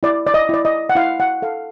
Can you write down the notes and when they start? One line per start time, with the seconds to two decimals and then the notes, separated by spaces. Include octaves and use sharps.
0.03 E4 D5
0.27 D5
0.34 D#5
0.49 E4 D5
0.65 D#5
0.89 F#5
0.95 E4 F5
1.20 F#5
1.42 A4 F5